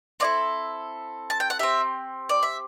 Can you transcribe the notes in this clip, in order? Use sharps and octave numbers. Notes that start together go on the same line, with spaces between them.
C4 E4 A4 D5
A5
G5
F#5
C4 G4 E5
D5
E5